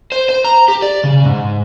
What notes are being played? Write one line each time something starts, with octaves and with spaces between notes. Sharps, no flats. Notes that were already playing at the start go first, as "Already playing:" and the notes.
C5
C5
A#5
G4
D5
C#3
G#2